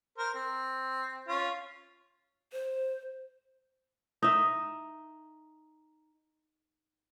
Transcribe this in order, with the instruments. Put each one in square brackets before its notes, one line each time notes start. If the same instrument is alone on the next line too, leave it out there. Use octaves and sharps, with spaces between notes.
[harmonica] A#4 C5
C4
C#4 F4
[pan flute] C5
[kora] D#4 E5